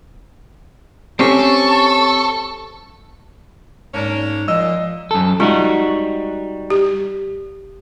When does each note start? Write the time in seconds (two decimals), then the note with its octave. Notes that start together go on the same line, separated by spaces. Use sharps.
1.20 C4 C#4 G4 A4 C#6
3.94 G#2 A#3 C#4 D4
4.48 A#2 F3 D#5 E6
5.11 F#2 A4
5.40 G3 G#3 D#4 F4 F#4
6.70 G4